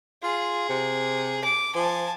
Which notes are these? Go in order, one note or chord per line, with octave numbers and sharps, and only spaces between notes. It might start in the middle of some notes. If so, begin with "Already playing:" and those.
F4 G#4
C3
D6
F3 G#5 A5